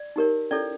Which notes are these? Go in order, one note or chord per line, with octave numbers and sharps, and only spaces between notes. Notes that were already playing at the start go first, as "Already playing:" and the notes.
Already playing: D5
D#4 G4 A#4 C#5
C#4 E4 A4 C#5 D5